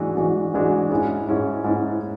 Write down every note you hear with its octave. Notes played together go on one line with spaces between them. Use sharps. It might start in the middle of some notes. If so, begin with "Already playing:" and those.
Already playing: G#2 E3 G#3 D4 F#4
G#2 E3 G#3 D4 F#4
G#2 E3 G#3 D4 F#4
G#2 G#3 C#4 E4
G#2 G#3 C#4 E4
G#2 G#3 C#4 E4